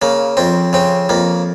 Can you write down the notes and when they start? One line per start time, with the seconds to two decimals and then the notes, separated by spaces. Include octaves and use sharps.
0.02 C#3 A#3
0.37 F2 C4
0.73 C#3 C4
1.09 F2 A#3